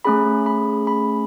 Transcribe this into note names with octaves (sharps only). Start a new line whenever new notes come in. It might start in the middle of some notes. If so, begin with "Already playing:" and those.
A3 C#4 G#4 B5
B5
B5